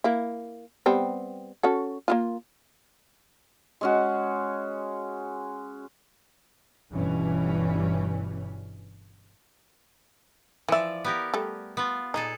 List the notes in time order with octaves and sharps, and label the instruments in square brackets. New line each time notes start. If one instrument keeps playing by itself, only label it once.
[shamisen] A#3 E4
G3 B3 C4
C#4 F#4 A4
A#3 E4 F4
[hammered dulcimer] G#3 C#4 F#4
[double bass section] G1 G2 B2 E3 G3 C#4
[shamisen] E3 E5 [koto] F3 D5
[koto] B3 G4 A#4
[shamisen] G3 A3
[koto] B3 F4
[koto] A#2 G#4 A4 [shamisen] D#4